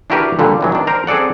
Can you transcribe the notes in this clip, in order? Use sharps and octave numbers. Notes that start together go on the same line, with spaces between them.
D4 E4 F#4 G4 A#4 B4
A#2 D3 G3
A2 E3 F#3
D#3 D4
A#4 C5 G5 A#5
C4 G#4 A4 D5 F#5